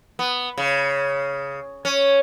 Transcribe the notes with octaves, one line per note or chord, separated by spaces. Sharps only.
B3
C#3
C#4